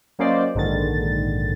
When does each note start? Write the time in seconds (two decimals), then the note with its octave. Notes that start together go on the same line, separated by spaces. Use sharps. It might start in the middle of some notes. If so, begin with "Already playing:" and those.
0.19 F#3 A#3 C#4 C5 D5 D#5
0.55 A#1 G#2 D3 D#3 A6